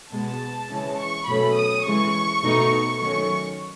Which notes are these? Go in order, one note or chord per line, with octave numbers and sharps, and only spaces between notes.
B2 G#3 B3 A5
C#3 E3 G#3 C#4
C#6
B2 F#3 A3 C#4 B5
D#6
C#3 E3 G#3 C#6
B2 A3 D#4
D#3 F#3 A3 C#4 C#6